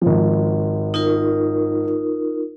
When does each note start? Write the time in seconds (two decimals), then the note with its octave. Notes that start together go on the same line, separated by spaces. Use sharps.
0.02 G#1 F3
0.94 D#4 F4 A#4